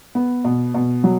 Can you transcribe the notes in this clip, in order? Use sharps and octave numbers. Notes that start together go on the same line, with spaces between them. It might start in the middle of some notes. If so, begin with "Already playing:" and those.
B3
B2
B2
F#3